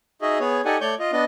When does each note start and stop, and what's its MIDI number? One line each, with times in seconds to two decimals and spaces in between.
0.22 0.38 63
0.22 0.38 66
0.22 0.38 68
0.22 0.38 75
0.22 0.38 76
0.40 0.61 59
0.40 0.61 68
0.40 0.61 73
0.65 0.77 63
0.65 0.77 67
0.65 0.77 69
0.65 0.77 74
0.65 0.77 78
0.65 0.77 80
0.81 0.95 57
0.81 0.95 73
0.81 0.95 74
0.81 0.95 85
0.81 0.95 91
0.99 1.12 65
0.99 1.12 75
1.12 1.24 59
1.12 1.24 62
1.12 1.24 75